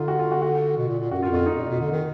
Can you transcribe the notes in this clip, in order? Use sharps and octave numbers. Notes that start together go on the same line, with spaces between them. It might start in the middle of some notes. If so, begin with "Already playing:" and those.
Already playing: D3 D#4 F4
F#4
F4
F#4
F#4
B2
A#2
A#2
F#2 F#4
F4
F2
F4
D#4
A#2
B2
D3
D#3